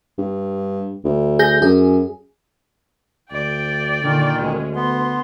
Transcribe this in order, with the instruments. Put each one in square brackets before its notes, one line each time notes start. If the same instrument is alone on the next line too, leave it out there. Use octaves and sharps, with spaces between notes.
[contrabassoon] G2
D2
[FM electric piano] G#4 G6 A#6
[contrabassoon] F#2 [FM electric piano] G#4
[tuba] D2 [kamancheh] D5 G5
[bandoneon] A#2 D#3 [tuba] D3
[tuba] D2 [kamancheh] G#3 C#4
[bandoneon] B3 [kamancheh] C6